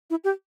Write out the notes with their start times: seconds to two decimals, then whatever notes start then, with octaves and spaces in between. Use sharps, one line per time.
0.10 E4
0.24 G4